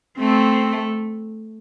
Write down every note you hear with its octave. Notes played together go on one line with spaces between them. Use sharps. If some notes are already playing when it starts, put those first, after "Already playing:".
A3 C4